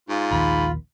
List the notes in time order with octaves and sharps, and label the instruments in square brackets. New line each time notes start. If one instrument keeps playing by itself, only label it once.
[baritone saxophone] G#2 [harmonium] F4
[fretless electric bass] A#1 D#2 D#3 [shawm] B5